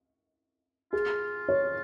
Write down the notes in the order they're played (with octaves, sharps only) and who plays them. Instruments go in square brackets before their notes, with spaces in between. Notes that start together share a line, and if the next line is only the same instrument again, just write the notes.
[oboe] F4 [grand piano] G#4
[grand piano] C#5